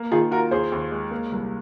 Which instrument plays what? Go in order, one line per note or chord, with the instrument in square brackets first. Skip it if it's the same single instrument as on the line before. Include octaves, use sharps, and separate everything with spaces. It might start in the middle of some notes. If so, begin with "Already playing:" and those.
Already playing: [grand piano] A#3
[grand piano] D#3 [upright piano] F4 G#4
[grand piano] F4 [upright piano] F#4 A#4
[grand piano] D#2 [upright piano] G#4 C5
[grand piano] D#2
G#3
A#3
C2